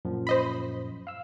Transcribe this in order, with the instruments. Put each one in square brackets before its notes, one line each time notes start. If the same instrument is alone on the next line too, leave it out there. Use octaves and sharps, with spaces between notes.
[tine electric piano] F#2 A#2 F3
[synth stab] C5 D#5 B5
[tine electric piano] F5 E6